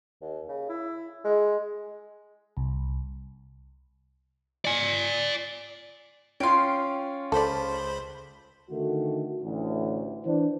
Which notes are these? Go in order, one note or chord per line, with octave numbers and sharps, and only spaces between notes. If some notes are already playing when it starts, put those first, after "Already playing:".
D#2
C#3
E4
G#3
C2
D5 G#5
C#4 F4 G5 C6
C#2 A4 C5 D5 B5
D3 D#3 A3 F#4
A1 D2
E3 D4 C5